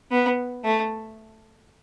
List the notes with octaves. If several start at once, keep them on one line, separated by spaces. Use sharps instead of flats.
B3
A3